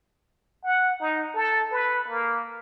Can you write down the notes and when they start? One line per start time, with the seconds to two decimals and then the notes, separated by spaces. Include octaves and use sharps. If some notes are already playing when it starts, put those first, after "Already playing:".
0.64 F#5
1.00 D#4
1.34 A4
1.72 B4
2.08 A#3